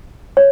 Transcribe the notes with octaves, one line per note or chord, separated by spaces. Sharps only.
C#5